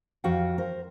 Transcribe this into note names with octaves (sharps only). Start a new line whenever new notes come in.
F2 F#4 F5 G5
A#4 C5